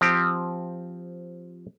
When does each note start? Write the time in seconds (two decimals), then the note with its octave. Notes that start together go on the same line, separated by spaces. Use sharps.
0.01 F3 C4 G4